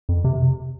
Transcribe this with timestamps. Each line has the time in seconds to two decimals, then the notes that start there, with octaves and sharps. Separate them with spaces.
0.09 F2
0.24 C3